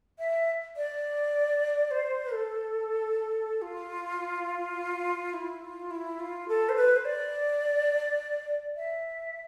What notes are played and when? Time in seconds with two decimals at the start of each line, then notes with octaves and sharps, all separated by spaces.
0.19 E5
0.77 D5
1.91 C5
2.34 A4
3.62 F4
5.33 E4
5.62 F4
5.91 E4
6.20 F4
6.48 A4
6.69 C5
6.76 B4
6.96 C5
7.05 D5
8.76 E5